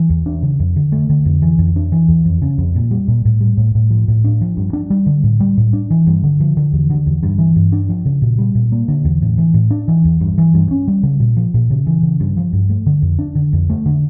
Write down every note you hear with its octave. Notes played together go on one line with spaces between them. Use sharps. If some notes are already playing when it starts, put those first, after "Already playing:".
Already playing: E3
E2
D4
C#3
F2
D3
A3
D3
F2
E3
F2
D4
E3
E2
F2
C#3
F2
A#2
G3
A#2
A2
G3
A2
A2
F3
A2
D4
F3
G2
D4
G3
D3
A2
G3
A2
D4
E3
G2
D3
F3
D3
E2
D3
E2
G2
E3
G2
D4
F3
C#3
A#2
G3
A#2
A#3
D3
E2
A2
E3
A2
D4
E3
E2
G2
E3
G2
C#4
G3
C#3
A#2
F3
A#2
C#3
E3
C#3
G2
F3
G2
A3
D3
F2
D4
D3
F2
A3
D3